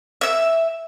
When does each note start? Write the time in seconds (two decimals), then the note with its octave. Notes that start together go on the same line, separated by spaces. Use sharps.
0.21 E5 E6